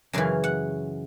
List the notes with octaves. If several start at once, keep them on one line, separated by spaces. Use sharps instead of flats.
F#2 C#3 E3 F5
F#5